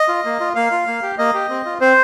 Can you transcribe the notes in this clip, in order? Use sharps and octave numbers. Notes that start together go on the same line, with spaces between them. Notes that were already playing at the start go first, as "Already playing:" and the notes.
Already playing: D#5
F4
A#3
F4
A#3 F5
F4
A#3
G4
A#3 D#5
G4
C4
F4
C4 C5